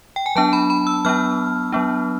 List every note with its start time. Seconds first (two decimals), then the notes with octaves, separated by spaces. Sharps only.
0.16 G5
0.26 G#5
0.36 F#3 B3 D4 A5
0.53 B5
0.70 B5
0.87 E6
1.05 F#3 B3 D4 F6
1.72 F#3 B3 D4